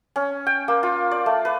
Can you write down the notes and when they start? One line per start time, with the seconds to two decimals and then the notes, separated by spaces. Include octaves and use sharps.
0.16 C#4
0.47 G5
0.68 A#3
0.83 F4
1.11 D5
1.26 A3
1.45 B4